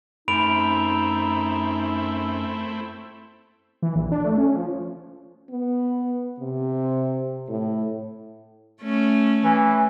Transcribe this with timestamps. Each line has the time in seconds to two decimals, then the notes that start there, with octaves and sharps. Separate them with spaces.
0.28 F#2 A3 C4 D#4 E4 B5 D7 F7
3.82 E3
3.96 A#1
4.12 D4
4.24 A3
4.38 C#4
4.56 F3
5.50 B3
6.39 C3
7.49 A2
8.82 A3 C#4
9.44 E3